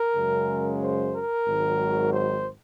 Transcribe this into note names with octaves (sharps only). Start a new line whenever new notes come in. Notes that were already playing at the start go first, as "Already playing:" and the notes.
Already playing: A#4
F#2 C#3 G#3
C5
A#4
G#1 G#2 D#3 F#3
C5